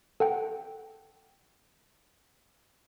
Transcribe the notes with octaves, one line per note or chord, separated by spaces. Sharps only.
A4 F#5 G5